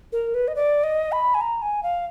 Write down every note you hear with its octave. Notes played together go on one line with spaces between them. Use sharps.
A#4
B4
D#5
D5
D#5
B5
G#5
A#5
G#5
F5